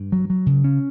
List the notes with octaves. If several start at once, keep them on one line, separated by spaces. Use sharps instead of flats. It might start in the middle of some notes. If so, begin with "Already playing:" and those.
Already playing: G2
F#3
F#3
C#3
C#4